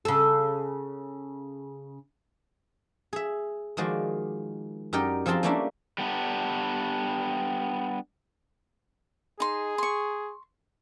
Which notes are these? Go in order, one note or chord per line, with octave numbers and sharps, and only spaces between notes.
C#3 A4
G#4 E5
D#3 F3 G#3 F#4 D5
F#2 D#4 G4 A#4 D5 G5
F3 C4 G#4 A#4 A5 C6
G3 A3 A#3 C#4 D4 E4
G3 B3 D4
D#4 G#4 C6
C6 C#6